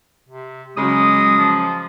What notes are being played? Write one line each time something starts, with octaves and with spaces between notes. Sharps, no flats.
C3
C#3 F#3 G#3 D#6
F3